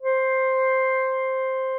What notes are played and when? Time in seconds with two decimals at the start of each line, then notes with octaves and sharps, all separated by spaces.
0.02 C5